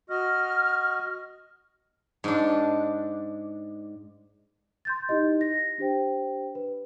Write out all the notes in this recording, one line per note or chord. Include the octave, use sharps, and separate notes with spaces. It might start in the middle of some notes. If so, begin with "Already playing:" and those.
F#4 D#5 F6
G#2 D4
C6 G6 A6
D#4 E4 G4 D#5
A#6
D4 G4 C5 G5
B4